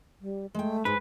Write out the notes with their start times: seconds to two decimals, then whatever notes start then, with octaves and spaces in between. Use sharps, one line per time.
0.21 G3
0.54 G#3 A3 G5
0.85 G#2 G#3 D#4 B4